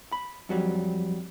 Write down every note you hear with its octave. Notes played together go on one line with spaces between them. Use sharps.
B5
F2 F#3 G3